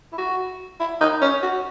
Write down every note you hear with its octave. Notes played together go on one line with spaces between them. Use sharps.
E4
F#4
E4
D#4
C#4
F#4